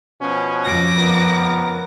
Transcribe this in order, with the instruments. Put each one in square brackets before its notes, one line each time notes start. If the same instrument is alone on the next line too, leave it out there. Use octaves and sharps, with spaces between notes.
[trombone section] B2 F3 C#4
[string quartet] F2 D6 A#6
[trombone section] C#2 B3 A#4